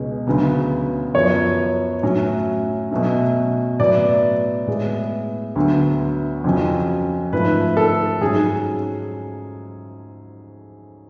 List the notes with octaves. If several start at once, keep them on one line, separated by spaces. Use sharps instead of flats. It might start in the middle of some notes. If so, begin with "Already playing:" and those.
Already playing: C#2 B2 G#3 C#4
D2 C#3 F#3 B3
F#2 F3 B3 C#5
A2 F#3 A3 C#4
B2 F#3 A3 C#4
A2 F#3 B3 D5
A2 G#3 B3
D2 D3 F#3 B3
F2 C#3 F#3 C#4
G#2 F3 A3 B4
A4
G#2 F#3 C#4 G#4